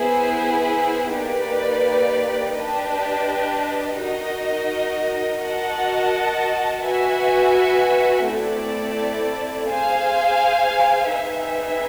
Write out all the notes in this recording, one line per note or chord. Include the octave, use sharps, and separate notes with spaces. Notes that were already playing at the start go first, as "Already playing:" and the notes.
Already playing: B3 E4 G#4 C5
A#3 D#4 G4 B4 D5
D4 G4 B4 D#5
D#4 F#4 A#4 D#5
F#4 A#4 D#5 F#5 A5
F#4 B4 E5 G#5
A3 C4 E4 A4 D5
G#4 C5 F5 G#5
C4 D#4 G#4 B4 E5